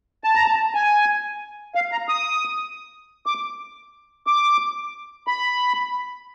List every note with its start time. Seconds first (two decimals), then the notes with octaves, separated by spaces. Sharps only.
0.24 A5
0.35 A#5
0.46 A5
0.75 G#5
1.75 F5
1.92 A#5
2.09 D#6
3.26 D6
4.27 D6
5.27 B5